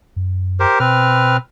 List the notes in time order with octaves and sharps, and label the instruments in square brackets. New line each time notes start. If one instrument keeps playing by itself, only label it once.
[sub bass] F#2
[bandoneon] G4 A#4 C5
[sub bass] B2 [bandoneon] C4 B4 F6